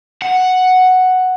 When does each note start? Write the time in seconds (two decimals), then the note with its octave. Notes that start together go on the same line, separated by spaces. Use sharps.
0.22 F#5